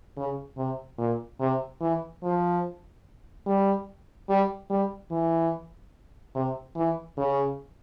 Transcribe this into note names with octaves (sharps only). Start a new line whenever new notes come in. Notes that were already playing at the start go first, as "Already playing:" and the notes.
C#3
C3
A#2
C3
E3
F3
G3
G3
G3
E3
C3
E3
C#3